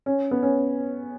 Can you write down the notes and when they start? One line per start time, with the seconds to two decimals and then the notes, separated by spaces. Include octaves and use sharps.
0.06 C#4
0.31 B3
0.43 C#4